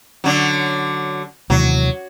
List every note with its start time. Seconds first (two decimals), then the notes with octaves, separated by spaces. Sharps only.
0.24 D3 F#3
1.50 D#2 C3 E3 F#3